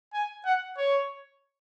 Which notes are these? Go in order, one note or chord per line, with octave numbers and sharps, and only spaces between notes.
G#5
F#5
C#5